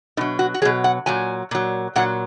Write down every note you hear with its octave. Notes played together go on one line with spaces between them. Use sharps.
B2 F#3 D#4
F#4
F#4
B2 F#3 G#4
F#5
A#2 F#3 G#5
A#2 F#3
A#2 F#3 F#5